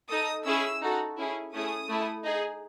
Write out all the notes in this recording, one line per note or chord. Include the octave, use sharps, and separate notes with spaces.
D#4 A4 D#6
C#4 E4 G#4 E6
D#4 F#4 A4
C#4 E4 G#4
A3 C#4 E4 G#4 D#6
A3 E4 A4
D#4 G#4